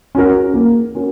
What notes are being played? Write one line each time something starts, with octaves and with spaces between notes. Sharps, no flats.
C#4 F#4 A#4
A#3
C#4 F#4 A#4